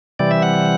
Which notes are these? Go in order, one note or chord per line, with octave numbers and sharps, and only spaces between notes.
C3 E3 G3 D5
E5
F#5